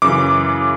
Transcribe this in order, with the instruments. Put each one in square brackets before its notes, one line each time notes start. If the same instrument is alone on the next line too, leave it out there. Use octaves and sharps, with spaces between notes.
[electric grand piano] F#2 C#3 E3 D6